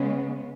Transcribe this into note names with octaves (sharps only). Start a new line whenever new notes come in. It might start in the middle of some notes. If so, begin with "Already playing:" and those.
Already playing: C#3 G#3 B3